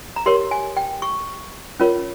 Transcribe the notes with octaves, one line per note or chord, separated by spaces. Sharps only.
A#5
G4 A#4 C#5 C6
G#5
G5
C#6
C#4 F4 A#4 C#5